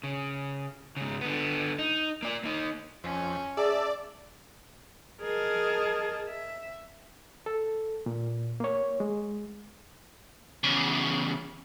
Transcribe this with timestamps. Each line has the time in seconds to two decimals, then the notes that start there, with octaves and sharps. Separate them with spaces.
0.03 C#3
0.97 G#2 C#3
1.21 D3 B3
1.78 D#4
2.23 A#3 D5
2.43 A#3 D#4
3.04 F2 C#4
3.57 G#4 D5 E5 A5 D6
5.22 G#4 A#4 D#5 A5
6.29 E5
7.46 A4
8.06 A#2
8.60 A#3 C#5
9.00 G#3
10.64 E2 C#3